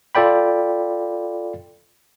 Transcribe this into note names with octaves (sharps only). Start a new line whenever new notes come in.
F4 A4 D5 G5 B5